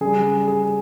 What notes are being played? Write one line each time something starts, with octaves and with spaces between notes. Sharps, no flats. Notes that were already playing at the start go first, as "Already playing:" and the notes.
C#3 G3 G#4
G#4